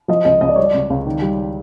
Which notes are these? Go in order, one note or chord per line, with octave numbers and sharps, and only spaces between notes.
F3 D#5
C#2 D#5
C#2 D#5
D5
G3 C#5
D5
C#2
C#2
D#3
G3